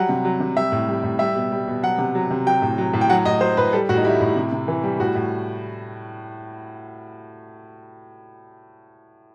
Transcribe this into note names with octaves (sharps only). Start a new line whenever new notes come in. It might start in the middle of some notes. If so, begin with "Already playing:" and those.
Already playing: F#3 G3 F#5
C3
F#3
C3
G3 E5
A2
G3
A2
G3 E5
B2
G3
B2
F#3 F#5
C3
F#3
C3
F#3 G5
A2
F#3
A2
G5
F#3 F#5
A2 D#5
F#3 C5
A2 B4
G3 A4
A2 F#4
D#4
G3 E4
A2 E4
C3
C3
E3
G3
A2 F#4
A2